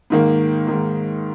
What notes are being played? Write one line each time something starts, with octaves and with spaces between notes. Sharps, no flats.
G#2 D#3 A#3
G#2 D#3 A#3